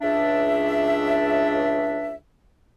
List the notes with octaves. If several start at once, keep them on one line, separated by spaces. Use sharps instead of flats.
C#2 D4 E5